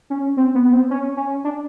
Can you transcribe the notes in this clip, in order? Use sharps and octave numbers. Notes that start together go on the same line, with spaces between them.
C#4
C4
B3
B3
C4
C#4
C#4
D4